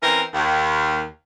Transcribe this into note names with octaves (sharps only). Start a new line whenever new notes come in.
E3 C4 C#4 A#4
D#2